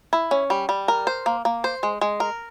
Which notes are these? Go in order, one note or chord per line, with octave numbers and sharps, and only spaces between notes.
E4
C#4
G3
G3
A#4
C5
A#3
A#3
C5
G#3
G#3
A#4